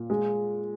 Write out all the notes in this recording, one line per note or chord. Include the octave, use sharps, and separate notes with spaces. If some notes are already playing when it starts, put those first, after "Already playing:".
Already playing: A#2
G#3